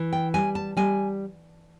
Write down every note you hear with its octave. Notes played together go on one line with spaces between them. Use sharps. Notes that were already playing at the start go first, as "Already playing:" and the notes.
Already playing: E3
G5
G3 G#5
A5
G3 G#5